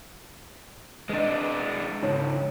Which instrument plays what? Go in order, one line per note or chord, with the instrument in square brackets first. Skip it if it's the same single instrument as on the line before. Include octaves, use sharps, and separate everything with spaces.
[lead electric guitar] G#3 D4 [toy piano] B4 D#5
[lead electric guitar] C#2 G#2 [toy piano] D#4 E4 C#5